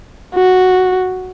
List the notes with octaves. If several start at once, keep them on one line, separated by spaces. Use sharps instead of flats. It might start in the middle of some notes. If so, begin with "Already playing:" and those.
F#4